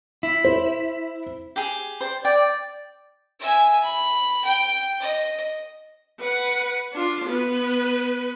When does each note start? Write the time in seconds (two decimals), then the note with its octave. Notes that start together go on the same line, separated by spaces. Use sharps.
0.23 E4
0.45 C5
1.56 G4 G#4
2.01 C5 D5
2.25 D5 G5
3.40 E5 G#5
3.84 B5
4.45 G5
5.00 D#5
6.20 B4 F#5
6.93 D4 F4
7.25 B3 B4